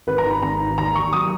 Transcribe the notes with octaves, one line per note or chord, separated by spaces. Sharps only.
G#1 B4
A#5
D#3
B5
G#1 A#5
D#3
D#2 A#5
D#2 C#6
F#3 D#6